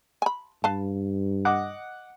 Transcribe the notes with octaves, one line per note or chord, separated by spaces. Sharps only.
G#5 B5
G2 B4 F5 A5
D#5 F#5 D6